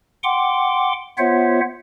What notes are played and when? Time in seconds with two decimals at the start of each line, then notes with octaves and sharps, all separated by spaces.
0.24 F#5 G5 C6 D6
1.18 B3 F4 C5 C#5 E5 F#5